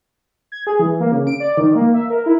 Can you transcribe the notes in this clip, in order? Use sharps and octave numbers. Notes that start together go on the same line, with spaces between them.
G#6
G#4
E3
A#3
C#3
D7
D5
D#3
A#3
E5
A#4
E4